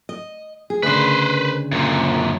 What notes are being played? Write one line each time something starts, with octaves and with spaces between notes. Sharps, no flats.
D#5
G#4
D2 C#3 B4 C5
F#2 A#2